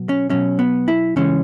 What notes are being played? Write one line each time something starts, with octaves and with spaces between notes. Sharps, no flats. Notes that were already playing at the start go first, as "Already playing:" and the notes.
Already playing: B2 F#3
C#4
B2 F#3 C#4
B3
E4
C#3 E3 G#3 C#4